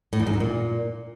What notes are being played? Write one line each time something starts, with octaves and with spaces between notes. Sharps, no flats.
A2
E2
G#2
F#2
A#2